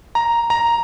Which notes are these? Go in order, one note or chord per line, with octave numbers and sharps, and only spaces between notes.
A#5
A#5